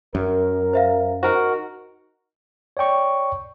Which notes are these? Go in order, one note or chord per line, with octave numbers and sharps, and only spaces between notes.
F#2 A#4
C5 E5 F5
D#4 F#4 A#4 C5 F#5
C#5 D5 G5 C#6